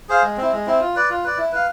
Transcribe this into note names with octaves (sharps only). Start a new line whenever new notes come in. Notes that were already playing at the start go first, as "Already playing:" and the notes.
G#4 C5 F5
G#3
C4
E4
G#3
C4 E4
F4
B4 D5
F4
B4 D5
E4
B4 F5